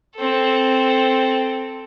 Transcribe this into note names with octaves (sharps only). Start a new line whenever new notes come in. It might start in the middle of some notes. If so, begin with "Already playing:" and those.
C4 A4